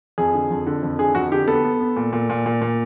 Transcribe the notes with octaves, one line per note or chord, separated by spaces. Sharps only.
F2 G#4
D3
F2
D3
F2
D3 G#4
F2 F#4
D3 G4
B3 A4
B3
B3
A#2
A#2
A#2
A#2
A#2